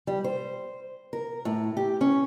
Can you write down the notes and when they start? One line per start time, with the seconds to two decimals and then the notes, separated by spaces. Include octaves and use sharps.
0.07 G3
0.24 C5
1.13 A#4
1.45 A2
1.77 G4
2.01 C#4